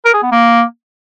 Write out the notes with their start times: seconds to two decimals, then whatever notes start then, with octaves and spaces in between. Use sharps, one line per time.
0.05 A#4
0.14 G#4
0.23 B3
0.32 A#3